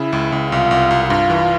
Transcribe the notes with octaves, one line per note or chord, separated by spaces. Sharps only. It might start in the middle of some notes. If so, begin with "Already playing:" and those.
Already playing: C#3 E4
C#2
C#2
C2 F4
C2
C2
G2 F4
E3